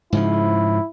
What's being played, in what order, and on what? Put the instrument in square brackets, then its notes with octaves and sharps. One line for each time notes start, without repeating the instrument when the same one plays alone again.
[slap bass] G#2 C#3 F3 [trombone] E4